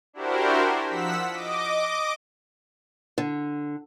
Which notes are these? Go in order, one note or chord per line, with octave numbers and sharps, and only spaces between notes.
D4 E4 F#4 G4 A#4 C5
F3 F#5 E6 B6
D#5 D6
D3